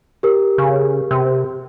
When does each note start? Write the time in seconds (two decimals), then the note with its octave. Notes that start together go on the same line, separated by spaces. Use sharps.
0.23 G4 A#4
0.58 C#3
1.11 C3